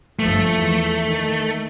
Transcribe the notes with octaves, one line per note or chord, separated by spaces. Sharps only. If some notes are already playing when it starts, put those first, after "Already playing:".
G1 F3 A3
E2
D#3